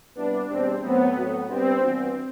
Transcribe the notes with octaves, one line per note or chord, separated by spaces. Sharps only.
C3 G3 B3 D4 E4 B4
E2 B2 G3 C4 D4 G4
A2 F#3 A3 B3 C4
A2 F#3 C4 F#4
C3 G3 C4 D4 G4 B4
G2 E3 B3 D4 F#4